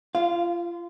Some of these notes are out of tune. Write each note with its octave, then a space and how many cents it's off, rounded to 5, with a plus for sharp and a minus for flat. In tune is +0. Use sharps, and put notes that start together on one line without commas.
F4 -25 F5 +0